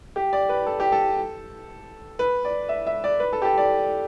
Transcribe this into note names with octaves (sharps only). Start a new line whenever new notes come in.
G4
D5
B4
A4
G4
A4
B4
D5
E5
E5
D5
B4
A4
G4
A4
D5